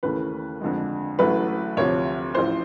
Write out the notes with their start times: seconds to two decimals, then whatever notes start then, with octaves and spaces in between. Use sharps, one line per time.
0.03 D#2 C#3 E3 A3 B4
0.61 F2 D3 F3 G#3
1.19 A1 A2 F#3 A3 B4
1.77 D2 C3 F3 C#5
2.35 A1 A2 F3 C5